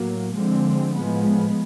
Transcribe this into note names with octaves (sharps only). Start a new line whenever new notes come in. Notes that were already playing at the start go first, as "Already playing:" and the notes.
Already playing: A2 F#3 A#3
D3 F3 G#3 C4
A2 F3 G#3 B3